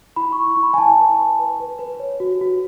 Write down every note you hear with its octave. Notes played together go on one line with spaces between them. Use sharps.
E4 B5
C#6
E4
C#6
E4
B5
G#5
E4 A5
B4
B4
B4
B4
B4
C#5
F#4
F#4